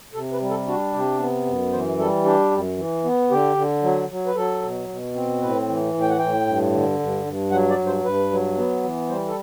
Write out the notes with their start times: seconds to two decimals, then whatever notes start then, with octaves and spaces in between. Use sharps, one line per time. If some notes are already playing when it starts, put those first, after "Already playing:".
0.14 C3 A4
0.32 B4
0.41 G3
0.50 A4
0.67 D4 F#4
0.93 C3 G4
1.19 B3
1.45 F#2
1.72 E3 C5
1.98 G3 A4
2.25 D4 G4
2.51 F#2
2.78 E3
3.04 B3
3.30 D3 G4
3.56 D3
3.83 F#3
4.09 F#3
4.26 B4
4.35 F#3 A4
4.62 B2
4.88 B2
5.15 C4
5.41 A2 B4
5.67 E3
5.93 A2
6.01 G5
6.09 F#5
6.18 A2 G5
6.46 G2
6.72 D3
6.99 G2
7.26 G2
7.51 F#3 F#5
7.69 D5
7.78 G2
7.86 C5
8.04 G2 B4
8.31 F#3
8.57 B3
8.84 E3
9.09 G3 C5
9.27 A4